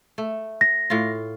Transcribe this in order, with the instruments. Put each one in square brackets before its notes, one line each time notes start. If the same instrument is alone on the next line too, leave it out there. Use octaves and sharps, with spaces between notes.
[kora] A3
[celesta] A#6
[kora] A2 F4